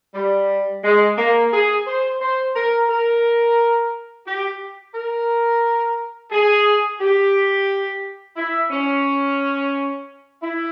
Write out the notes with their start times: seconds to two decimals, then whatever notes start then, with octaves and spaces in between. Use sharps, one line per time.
0.14 G3
0.83 G#3
1.17 A#3
1.52 G#4
1.86 C5
2.20 C5
2.55 A#4
2.89 A#4
4.26 G4
4.94 A#4
6.31 G#4
6.99 G4
8.36 E4
8.70 C#4
10.42 E4